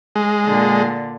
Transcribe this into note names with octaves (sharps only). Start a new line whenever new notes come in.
G#3
A#2 D3